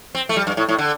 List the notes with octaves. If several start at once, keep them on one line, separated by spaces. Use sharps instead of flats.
C4
A3
G3
G2
A2
A2
D3